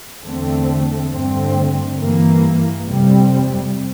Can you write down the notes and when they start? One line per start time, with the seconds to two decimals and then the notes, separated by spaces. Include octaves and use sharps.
0.25 E2 D3 A3 C4
1.12 G2 D3 A3 C4
1.98 G2 E3 A#3
2.85 F2 C3 G3 C4